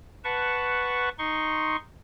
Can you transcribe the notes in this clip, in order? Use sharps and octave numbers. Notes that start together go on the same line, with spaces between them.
B4 F#5 A5 C#6
D#4 C6 C#6